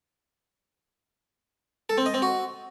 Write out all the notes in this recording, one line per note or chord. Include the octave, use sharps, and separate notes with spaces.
A4
C4
D#5
C4
F#4